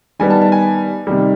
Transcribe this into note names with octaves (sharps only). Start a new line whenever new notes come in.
D#3 G3 B3 G#5
A5
A5
G#5
C3 D#3 G3